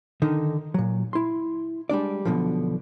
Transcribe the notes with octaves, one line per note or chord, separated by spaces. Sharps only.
D3 D#3 D#4
A#2 F#3
E4 C6
G3 G#3 D4 D5
B1 G#2 B2 D3 F3